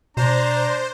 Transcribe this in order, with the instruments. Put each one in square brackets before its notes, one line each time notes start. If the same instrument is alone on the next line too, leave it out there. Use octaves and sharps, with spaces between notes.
[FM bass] B2 [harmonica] D4 A#5 [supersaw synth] C5